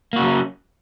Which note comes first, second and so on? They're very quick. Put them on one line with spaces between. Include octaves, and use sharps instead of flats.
A#3 F#4 C#3 F#3 C#4